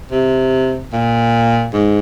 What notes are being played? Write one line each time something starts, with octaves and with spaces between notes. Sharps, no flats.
C3
A#2
G#2